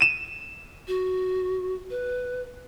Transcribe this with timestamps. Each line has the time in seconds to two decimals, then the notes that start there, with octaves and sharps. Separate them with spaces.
0.01 D#7 E7
0.88 F#4
1.90 B4